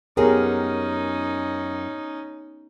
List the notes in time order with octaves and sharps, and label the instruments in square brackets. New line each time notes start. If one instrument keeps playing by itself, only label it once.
[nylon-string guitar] F#2 G#4 [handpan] B3 G4 A#4 [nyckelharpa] C#4 D#4